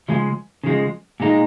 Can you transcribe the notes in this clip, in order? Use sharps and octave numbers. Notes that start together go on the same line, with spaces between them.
C#3 F3 G#3
C#3 F3 G#3
A#2 G#3 D#4